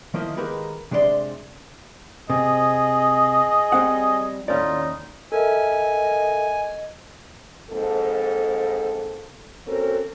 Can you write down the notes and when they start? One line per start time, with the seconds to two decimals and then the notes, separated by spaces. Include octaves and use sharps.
0.14 D#3 F3 A#3 E4 D#5
0.37 D#3 G#3 A#3 G4 A#4 B4
0.91 C3 G#3 D4 C#5 D5 C6
2.30 C3 G#4 D#5
3.72 G3 C4 F#5
4.48 D#2 A2 C#4 D#4 F4 D5
5.32 A4 A#4 D#5 E5 G#5
7.71 F2 G#2 A#3 A4
9.67 A#3 C4 C#4 F#4 A4 A#4